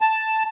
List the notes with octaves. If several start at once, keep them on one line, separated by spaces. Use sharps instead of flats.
A5